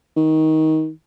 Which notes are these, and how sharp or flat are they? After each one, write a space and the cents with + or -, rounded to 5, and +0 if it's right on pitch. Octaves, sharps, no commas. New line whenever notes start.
D#3 +20